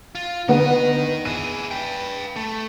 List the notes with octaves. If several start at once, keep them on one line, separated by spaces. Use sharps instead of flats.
F4
D3 D#3 B3 D#5 F#5
E4 G#4 D#7
B4 G5
A3